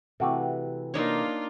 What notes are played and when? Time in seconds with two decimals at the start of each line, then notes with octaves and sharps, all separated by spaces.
0.20 C3 E3 A3 F#4 G4 B4
0.94 A#3 D4 D#4 F4 C#5